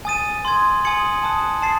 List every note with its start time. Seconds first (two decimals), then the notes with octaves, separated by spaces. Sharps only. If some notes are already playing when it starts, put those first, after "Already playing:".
0.05 G#5 D#6 A6 D#7
0.45 C6 D#6 G#6
0.84 G#5 D#6 G#6 C#7 F#7
1.23 A5 D#6 F#6
1.62 A5 D#6 A6 C7